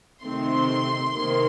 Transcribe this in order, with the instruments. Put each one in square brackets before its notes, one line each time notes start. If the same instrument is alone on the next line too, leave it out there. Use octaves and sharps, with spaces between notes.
[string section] C3 D#3 A3 C4 C6
C3 D#3 A#3